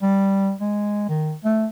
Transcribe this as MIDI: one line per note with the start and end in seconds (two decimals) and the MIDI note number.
0.02 0.53 55
0.61 1.08 56
1.08 1.34 51
1.44 1.67 57